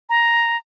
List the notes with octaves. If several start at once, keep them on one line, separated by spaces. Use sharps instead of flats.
A#5